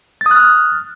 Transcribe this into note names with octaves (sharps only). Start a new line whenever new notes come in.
D#6 F6 F#6 A6